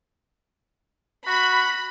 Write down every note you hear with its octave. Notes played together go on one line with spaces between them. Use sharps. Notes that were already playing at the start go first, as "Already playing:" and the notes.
F#4 B5